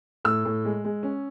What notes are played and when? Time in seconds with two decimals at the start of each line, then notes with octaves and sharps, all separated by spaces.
0.25 A2 E6
0.45 A2
0.65 G#3
0.85 G#3
1.03 C#4